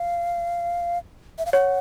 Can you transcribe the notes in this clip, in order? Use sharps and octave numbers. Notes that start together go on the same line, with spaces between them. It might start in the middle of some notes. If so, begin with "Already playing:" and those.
Already playing: F5
E5
F5
C#5 F#5